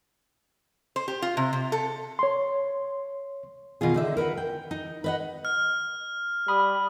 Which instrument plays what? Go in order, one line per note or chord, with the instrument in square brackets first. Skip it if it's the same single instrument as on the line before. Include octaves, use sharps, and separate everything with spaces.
[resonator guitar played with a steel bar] C5
G4
F4
C3
C3
A4
[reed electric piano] C#5 C6
[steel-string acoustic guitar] B2 D#3 F4 G#4
D3 D#4 E5
A#4 B4 E5 F#5
G5
D#4
B4 D#5 F#5
[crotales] F6
[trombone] G3 [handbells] B5 D#6